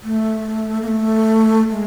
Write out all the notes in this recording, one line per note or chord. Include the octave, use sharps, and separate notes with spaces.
A3
A#3
A3
G#3